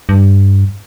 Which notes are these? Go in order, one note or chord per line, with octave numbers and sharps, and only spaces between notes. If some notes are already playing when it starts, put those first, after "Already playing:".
G2